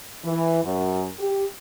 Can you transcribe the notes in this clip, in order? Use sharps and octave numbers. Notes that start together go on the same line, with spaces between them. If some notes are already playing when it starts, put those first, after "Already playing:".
E3
F#2
G4